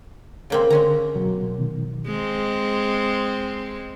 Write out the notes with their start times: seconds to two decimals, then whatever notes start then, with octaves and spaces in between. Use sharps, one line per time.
0.50 C#3 A#3 C4
0.70 D3 G#3 C#4 A#5
1.15 B2 F#3
1.58 B2 D#3
2.07 G#3 C4